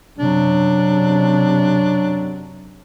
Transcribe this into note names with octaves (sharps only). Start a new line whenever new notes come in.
F#2 C3 F#3 D4